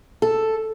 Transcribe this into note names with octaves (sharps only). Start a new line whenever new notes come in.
A4